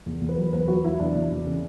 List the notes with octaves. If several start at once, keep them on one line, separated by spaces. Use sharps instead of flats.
E2
E2
B4
F#3
E2 B4
F#3 F#4
F#3 E4
E2 D4
E2
E2
C#3 C#4